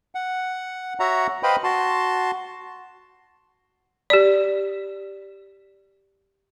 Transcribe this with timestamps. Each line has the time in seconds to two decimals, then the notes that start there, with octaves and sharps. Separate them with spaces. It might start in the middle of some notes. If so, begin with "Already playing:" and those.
0.15 F#5
1.00 F#4 C#5 E5 F#5 A#5
1.43 B4 C5 D#5 F5 G5 B5
1.64 F#4 A5 C6
4.10 G4 D5